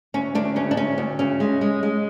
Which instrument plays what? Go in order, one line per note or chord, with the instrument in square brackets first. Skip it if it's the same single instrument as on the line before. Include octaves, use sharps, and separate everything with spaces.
[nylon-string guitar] D2 C#4
D2 D4
C#3 C#4
D4
D2 C#4
D2
C#3 C#4
G#3
G#3
G#3